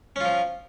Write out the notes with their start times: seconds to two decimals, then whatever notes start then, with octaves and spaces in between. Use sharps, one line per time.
0.16 C#4
0.20 F4
0.25 F3